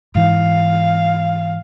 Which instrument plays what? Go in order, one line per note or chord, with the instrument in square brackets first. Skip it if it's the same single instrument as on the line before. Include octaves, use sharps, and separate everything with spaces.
[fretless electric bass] G#2 E3 [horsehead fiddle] F5